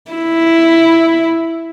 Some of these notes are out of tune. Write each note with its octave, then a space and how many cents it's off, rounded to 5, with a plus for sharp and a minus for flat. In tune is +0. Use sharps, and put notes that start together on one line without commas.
E4 +0